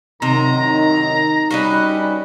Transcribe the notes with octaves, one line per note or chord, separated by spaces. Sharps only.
F#2 A2 C3 D#3 D#4 A#5
G3 C#4 F#4 B4 D#5